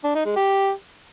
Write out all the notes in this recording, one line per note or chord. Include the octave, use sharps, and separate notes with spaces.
D4
D#4
G#3
G4